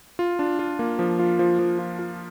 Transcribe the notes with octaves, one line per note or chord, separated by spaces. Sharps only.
F4
D4
F4
A#3
F3
F4
F3
F3
F4
F4